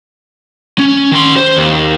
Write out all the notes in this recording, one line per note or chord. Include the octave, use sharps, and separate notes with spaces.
C#4
D#3 C6
C5
D#2